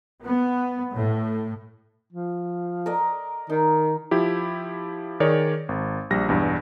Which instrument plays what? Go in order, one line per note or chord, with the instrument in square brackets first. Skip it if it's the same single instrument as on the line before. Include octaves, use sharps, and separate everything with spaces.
[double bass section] B3
A2
[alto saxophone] F3
[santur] A#4 D5 D#5
[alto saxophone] D#3 [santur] D#4
[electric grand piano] F3 E4 G4
D#3 G#4 A#4 C#5 D5
G#1
A#1 G3 A#6
B1 E2 G2